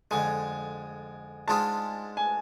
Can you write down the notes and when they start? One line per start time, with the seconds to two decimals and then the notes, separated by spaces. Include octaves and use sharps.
0.11 F2 D3 G#3 G#5
1.48 G#2 G#3 D4 F4 G#4 A5
2.17 G#5